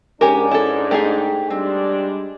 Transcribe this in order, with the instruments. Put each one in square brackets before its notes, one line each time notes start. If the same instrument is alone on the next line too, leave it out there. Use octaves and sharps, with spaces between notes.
[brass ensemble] G#2 D4 [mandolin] C#4 G#5 D6 [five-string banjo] G4 A#4
[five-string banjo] E4 A4
[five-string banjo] A3 D#4 G#4 [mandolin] G4
[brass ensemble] G3 G#3 D4 [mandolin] C4